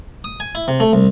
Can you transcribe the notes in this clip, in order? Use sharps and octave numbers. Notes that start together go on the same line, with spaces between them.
D#6
G#5
E4
C3
A3
C2